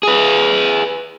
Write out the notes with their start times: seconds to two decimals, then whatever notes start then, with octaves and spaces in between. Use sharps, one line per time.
0.03 G#4 B4